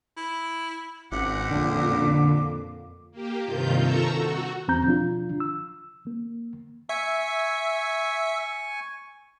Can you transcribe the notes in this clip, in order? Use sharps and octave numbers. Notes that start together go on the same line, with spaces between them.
E4
G#1 C#2 F#5 D6
F2 A#2 D3
A#3 G4
G2 C3 D#3 F4 G6
A4 A#5 C#6 E6
F#4
E2 C4 A#5 G6
B2 F3 D4 F4
E6
A#3
E5 G#5 C#6